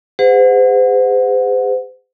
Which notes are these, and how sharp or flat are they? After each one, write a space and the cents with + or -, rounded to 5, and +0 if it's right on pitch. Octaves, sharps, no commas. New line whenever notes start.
G#4 -40 C5 -40 F#5 -25